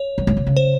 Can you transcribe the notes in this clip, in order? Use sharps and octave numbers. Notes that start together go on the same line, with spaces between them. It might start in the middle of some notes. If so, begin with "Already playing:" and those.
Already playing: C#5
F#2
G#2
C3
C#3
C5